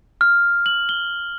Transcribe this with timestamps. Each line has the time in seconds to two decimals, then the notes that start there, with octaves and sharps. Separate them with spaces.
0.21 F6
0.66 F#7
0.89 G7